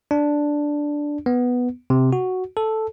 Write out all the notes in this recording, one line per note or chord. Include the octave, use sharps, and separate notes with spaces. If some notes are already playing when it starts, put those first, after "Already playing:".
D4
B3
C3
F#4
A4